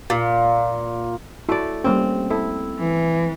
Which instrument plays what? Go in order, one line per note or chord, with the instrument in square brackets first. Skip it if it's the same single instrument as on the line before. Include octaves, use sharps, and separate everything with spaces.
[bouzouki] A#2
[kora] A3 D5 [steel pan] E4 F#4
[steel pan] G3 A#3 C#4 [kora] C4
[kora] E4 [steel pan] A4
[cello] E3